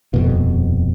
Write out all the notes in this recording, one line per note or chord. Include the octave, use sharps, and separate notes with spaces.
D#1 F2 B2